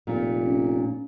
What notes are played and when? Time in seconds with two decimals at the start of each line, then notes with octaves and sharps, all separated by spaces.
0.07 F1 A#2
0.44 C#4